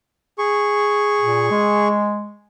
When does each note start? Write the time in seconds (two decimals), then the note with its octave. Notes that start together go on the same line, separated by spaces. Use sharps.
0.38 G#4 C#6
1.21 A#2
1.51 G#3